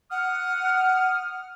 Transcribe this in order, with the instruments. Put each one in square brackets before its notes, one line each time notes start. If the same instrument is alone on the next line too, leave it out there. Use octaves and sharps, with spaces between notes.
[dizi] F#5 [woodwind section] D#6 F6